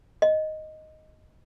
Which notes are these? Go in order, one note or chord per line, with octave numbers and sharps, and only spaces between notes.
D#5